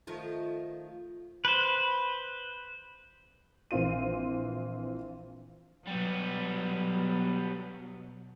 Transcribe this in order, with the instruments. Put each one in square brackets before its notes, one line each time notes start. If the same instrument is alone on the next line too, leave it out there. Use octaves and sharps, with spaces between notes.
[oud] D#3 F3 A3
[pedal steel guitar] B4 C5
[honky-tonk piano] A#1 E3 C4 F4 D#7
[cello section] B2 F#3 [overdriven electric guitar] G3 B3